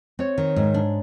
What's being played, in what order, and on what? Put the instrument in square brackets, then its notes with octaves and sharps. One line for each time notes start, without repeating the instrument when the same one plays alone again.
[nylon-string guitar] C4 [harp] C#5
[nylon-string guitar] D#3
G#2
D4